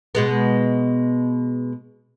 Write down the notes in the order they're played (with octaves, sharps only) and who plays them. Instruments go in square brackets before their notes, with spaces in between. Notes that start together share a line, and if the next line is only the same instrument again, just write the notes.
[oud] B2 G#3 B3